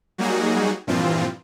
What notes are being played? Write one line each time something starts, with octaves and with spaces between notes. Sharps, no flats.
F#3 G3 A#3 D#4 F#4 G#4
G2 A#2 E3 F3 C4 F4